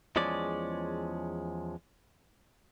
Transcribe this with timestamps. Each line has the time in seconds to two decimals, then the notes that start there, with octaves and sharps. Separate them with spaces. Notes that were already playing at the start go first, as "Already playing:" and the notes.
0.16 E2 F3 G#3 C#4 D5